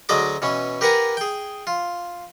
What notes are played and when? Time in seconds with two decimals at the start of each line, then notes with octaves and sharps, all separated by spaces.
0.09 D2 F#3 G#3 D5 D#5 D6
0.42 B2 E3 C#4
0.81 G4 A#4 B4 F#5 G#5 A#5
1.17 G#4 G5
1.67 F4